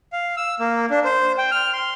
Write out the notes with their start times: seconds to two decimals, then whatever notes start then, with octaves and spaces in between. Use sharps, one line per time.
0.13 F5
0.37 E6
0.60 A#3
0.90 D4
1.05 C5
1.38 G5
1.52 F6
1.73 C6